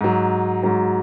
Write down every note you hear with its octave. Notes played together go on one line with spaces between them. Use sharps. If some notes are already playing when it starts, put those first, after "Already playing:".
G#2 F#3
G#2 F#3